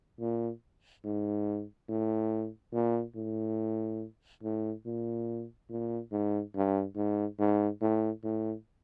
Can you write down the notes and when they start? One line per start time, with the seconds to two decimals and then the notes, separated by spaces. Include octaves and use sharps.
0.20 A#2
1.04 G#2
1.89 A2
2.73 A#2
3.16 A2
4.43 A2
4.86 A#2
5.70 A#2
6.12 G#2
6.55 G2
6.96 G#2
7.39 G#2
7.81 A2
8.24 A2